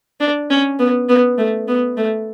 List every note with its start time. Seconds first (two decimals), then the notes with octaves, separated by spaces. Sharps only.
0.20 D4
0.50 C#4
0.79 B3
1.09 B3
1.38 A3
1.67 B3
1.97 A3